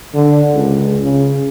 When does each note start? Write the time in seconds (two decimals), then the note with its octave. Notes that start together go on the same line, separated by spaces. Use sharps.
0.14 D3
0.54 C#2
1.04 C#3